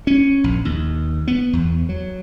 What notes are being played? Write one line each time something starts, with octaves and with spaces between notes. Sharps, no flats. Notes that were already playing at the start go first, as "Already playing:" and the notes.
C#4
A#1
D#2
B3
E2
F#3